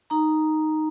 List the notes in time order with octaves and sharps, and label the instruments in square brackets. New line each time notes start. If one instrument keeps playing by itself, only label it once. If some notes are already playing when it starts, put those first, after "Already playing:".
[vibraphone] D#4 A#5